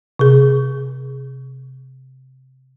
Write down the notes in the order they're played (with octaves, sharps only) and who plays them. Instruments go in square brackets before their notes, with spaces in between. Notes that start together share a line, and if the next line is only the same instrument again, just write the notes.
[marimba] C3 G#4